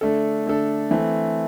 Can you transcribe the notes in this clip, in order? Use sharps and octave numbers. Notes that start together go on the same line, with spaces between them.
D3 A3 D4 A4
D3 A3 D4 A4
E3 A3 C4